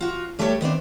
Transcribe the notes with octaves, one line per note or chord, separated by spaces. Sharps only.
F4 F#4
G3 A3 G4 A4 B4 C#5
D#3 B3 C4 D4